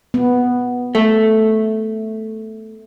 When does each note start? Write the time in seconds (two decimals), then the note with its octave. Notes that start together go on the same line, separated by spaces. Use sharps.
0.14 B3
0.95 A3